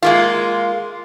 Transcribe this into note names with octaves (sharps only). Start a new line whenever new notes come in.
G#3 A#3 F4